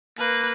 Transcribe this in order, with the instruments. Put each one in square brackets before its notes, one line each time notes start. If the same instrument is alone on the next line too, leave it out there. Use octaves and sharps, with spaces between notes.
[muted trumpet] A#3 [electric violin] B4